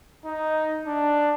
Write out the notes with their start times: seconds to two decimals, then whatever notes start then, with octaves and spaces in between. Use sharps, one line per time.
0.25 D#4
0.87 D4